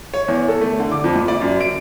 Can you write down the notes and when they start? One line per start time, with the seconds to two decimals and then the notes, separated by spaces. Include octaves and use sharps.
0.14 C#5
0.28 E2
0.48 A4
0.61 A3
0.79 D3
0.91 D6
1.04 F2
1.15 A#2
1.28 D5
1.42 F#2
1.61 D7